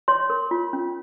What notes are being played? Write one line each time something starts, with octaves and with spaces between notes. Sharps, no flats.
C#5 C6
A#4
F4
C#4